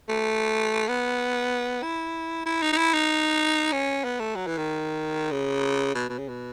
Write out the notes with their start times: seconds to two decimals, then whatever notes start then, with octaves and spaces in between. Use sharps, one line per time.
0.09 A3
0.88 B3
1.83 E4
2.46 E4
2.62 D#4
2.73 D#4
2.77 E4
2.94 D#4
3.72 C#4
4.04 B3
4.20 A3
4.36 F#3
4.47 E3
4.57 D#3
5.31 C#3
5.95 B2
6.09 B2
6.18 C#3
6.28 B2